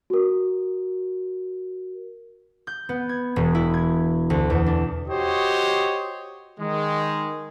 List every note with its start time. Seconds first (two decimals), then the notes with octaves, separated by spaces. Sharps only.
0.10 F#4 A#4
2.67 G6
2.89 B3
3.09 G#6
3.36 E1
3.55 E4
3.74 G#6
4.30 D2
4.50 E2
4.66 D4
5.08 F#4 G4 C5 C#5 D#5
6.60 D#3 G#3